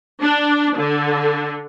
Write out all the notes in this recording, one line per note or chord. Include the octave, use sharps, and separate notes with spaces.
D4
D3